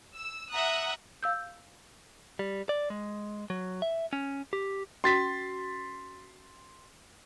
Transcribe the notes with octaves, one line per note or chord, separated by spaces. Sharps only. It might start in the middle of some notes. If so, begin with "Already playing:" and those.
E6
E5 F#5 A#5 D#6 F#6
F5 E6 G6
G3
D5
G#3
F#3
E5
C#4
G4
C#4 F#4 C6 A6 B6